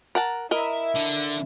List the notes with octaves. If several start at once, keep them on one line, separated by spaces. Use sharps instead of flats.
A#4 F#5 A5
E4 A#4 D#5 E5
D3